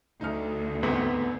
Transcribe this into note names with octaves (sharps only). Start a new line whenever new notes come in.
D2 D#4 F6
E2 G#2 B3 C4